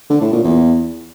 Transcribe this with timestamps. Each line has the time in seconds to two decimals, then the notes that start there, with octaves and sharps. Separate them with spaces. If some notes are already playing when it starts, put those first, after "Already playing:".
0.10 D3
0.21 A2
0.33 A#2
0.44 E2